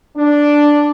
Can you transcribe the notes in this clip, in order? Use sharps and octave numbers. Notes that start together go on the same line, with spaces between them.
D4